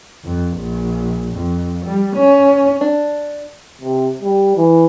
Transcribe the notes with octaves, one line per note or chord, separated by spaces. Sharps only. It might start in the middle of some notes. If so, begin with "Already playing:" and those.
F2
A#1
F2
G3
C#4
D4
C3
G3
E3